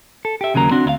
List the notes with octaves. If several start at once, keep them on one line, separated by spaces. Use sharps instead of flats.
A4
G4 E5
D#2 C#3 F#3 A#3 A#5
C4 D4 F#4
D2 E4 F5